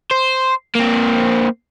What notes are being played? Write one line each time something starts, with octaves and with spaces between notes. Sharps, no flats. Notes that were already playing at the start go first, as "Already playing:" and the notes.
C5
A#3 C4